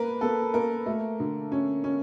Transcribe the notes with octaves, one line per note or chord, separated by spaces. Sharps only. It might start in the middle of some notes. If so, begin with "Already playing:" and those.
Already playing: A#3 A#4 B4
A#3 A4
A#3 A#4
A3
D3
C#4
C#4